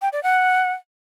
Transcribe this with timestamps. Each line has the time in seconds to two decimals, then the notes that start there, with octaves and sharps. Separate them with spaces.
0.02 G5
0.12 D5
0.23 F#5